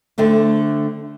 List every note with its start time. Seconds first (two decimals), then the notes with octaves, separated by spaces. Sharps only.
0.18 D3 A3 C4 D4